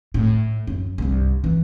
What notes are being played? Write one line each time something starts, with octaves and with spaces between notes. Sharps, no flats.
A2
F#2
C2 G2
E3